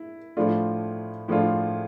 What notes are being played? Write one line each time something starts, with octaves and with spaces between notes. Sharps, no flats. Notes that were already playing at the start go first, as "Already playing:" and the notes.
Already playing: E4
A2 F3 A3 D4 F4
A2 F3 A3 D4 F4